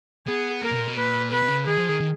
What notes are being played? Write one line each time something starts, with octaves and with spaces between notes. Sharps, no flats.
B3 G#4
A#3 A#4
B2
A#2
B2
A#2 B4
B2 B4
B2
C#3
D#3 G#4
F3
D#3
D#3